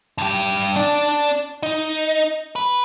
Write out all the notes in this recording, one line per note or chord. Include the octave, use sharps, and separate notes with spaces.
G2 G4
D4 D5
D#4
B4